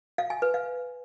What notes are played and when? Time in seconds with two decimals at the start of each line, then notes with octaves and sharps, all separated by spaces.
0.18 F5
0.30 G#5
0.42 B4
0.54 F5